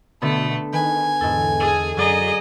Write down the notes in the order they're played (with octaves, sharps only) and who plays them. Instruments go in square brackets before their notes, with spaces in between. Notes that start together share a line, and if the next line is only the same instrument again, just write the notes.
[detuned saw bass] B2 [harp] D3 B3 [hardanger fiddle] A3 A4
[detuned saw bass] D#3 [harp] B4 [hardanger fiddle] G#5
[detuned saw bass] E2 [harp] G#2 A4
[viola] G#4 [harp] A4
[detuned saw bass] F#2 [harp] F#3 D5 A#5 [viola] G#4 D#5